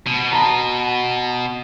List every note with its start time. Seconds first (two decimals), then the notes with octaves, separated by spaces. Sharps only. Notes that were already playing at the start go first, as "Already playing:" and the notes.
0.07 B2
0.32 A5 A#5